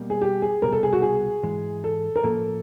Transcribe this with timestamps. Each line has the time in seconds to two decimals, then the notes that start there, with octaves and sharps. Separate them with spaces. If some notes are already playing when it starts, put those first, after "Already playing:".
Already playing: B2 G3 A#3
0.10 G#4
0.21 G4
0.42 G#4
0.62 C2 B2 G3 A#4
0.72 A4
0.83 G#4
0.93 F#4
1.02 G#4
1.43 G#2 E3 G#3
1.84 A4
2.16 A#4
2.23 A2 F3 A#3 C#4 F4 A4